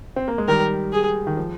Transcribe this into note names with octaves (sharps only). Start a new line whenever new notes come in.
C4
A#3
G#3
D#3 G3 A#4
G#4
D#3
F3